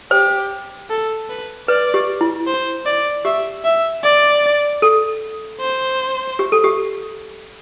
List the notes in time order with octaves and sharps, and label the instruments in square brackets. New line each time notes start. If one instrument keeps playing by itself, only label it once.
[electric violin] G4 [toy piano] C5
[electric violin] A4
B4
[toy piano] B4 [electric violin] D5
[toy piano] G4
E4
[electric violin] C5
D5
[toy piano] G4 [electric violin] E5
[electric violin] E5
D5
[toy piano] A4
[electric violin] C5
[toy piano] G4
A4
G4